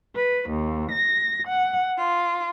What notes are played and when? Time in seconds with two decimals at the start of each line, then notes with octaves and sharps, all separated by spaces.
0.14 B4
0.49 D#2
0.91 A#6
1.47 F#5
1.98 F4